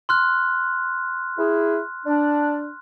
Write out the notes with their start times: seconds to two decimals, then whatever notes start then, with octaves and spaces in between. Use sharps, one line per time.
0.09 C6 F6 F#6
1.38 E4 G#4
2.06 D4